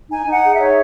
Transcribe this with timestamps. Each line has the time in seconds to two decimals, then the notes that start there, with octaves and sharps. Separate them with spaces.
0.08 D#4 G#5
0.26 D#4
0.31 F#5
0.43 G#4
0.54 E5
0.59 C#5